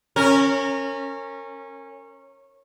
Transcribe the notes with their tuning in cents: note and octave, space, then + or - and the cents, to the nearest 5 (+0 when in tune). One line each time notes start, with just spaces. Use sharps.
C#4 -20 A#4 -25